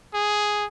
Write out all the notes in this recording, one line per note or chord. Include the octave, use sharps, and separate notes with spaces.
G#4